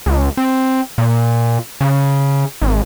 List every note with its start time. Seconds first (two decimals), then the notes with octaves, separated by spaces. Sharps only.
0.06 C#2
0.37 C4
0.98 A#2
1.81 C#3
2.62 G#1